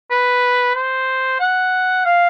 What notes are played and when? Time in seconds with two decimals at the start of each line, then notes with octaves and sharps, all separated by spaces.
0.11 B4
0.75 C5
1.40 F#5
2.05 F5